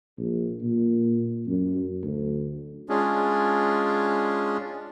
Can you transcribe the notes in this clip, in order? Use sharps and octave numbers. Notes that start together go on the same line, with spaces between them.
A#1
A#2
F#2
D2
G#3 C#4 D4 F4 G#4